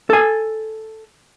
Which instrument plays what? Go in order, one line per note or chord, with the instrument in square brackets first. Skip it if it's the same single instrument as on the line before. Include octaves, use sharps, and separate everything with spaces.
[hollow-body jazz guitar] A4 G#5